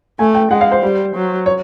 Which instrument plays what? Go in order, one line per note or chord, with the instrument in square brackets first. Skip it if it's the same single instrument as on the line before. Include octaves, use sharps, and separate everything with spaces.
[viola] A3 [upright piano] G#5
[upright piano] G5
[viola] G#3 [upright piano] F#5
[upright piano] F5
C5
[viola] G3
F#3
[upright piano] C#5